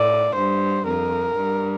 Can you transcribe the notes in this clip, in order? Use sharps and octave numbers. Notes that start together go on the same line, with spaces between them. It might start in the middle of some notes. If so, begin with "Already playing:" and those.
Already playing: A2 D5
G2 C5
F2 A#4
G2